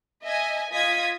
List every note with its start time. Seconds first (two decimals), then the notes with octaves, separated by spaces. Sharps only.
0.23 D#5 E5 G#5
0.71 F4 D#5 D#6 G#6 B6